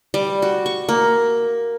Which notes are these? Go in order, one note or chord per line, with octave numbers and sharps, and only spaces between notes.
G3
F#4
C#6
A#3